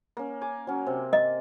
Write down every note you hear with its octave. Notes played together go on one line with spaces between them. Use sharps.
A#3 C#4
G#5 D6
F#3 C#4
C3
D#5